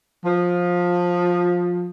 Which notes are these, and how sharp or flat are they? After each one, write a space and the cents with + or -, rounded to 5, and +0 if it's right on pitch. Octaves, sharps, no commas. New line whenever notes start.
F3 +15